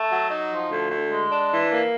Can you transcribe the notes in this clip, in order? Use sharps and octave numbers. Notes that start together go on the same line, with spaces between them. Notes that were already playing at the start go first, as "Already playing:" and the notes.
Already playing: A3
F#3
D#4
F3
D2
D2
G#3
D4
E3
A#3